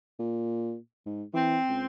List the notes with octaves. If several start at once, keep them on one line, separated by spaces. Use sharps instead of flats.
A#2
G#2
E3 C4
C#2